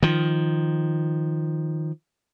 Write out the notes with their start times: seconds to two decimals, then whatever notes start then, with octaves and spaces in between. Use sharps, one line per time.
0.03 D#3 F3